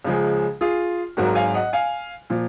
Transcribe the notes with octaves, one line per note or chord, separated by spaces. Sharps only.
C#2 C#3 F3 G#3
F4 G#4
G#1 G#2 F#3 F#4 A#4
F5 G#5
D#5 F#5
F5 G#5
A#2 F3